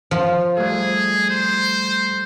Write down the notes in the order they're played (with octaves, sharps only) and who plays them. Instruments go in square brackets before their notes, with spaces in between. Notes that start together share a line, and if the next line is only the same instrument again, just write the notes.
[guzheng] F3 [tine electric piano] F6
[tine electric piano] G3 A3 A4 [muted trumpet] G#4
[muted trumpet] C5